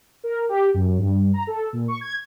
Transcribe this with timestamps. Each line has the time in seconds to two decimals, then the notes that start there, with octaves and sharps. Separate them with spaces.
0.24 A#4
0.49 G4
0.74 F#2
0.98 G2
1.34 A#5
1.47 A4
1.73 A#2
1.88 C#6
2.01 G#6